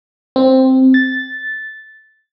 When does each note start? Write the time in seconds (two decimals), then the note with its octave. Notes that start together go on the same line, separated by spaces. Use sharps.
0.36 C4
0.94 A6